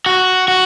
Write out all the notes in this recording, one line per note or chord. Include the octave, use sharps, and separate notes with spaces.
F#4
F#4